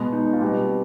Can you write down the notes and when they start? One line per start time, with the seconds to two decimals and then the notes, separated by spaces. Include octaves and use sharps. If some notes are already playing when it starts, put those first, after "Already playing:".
Already playing: B2 G#3 B3 B4
0.13 D#4
0.33 F4
0.41 B2 G3 C4 G4